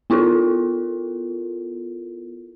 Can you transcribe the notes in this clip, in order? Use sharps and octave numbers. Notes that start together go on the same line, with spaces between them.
B3 E4 F4 A4 A#4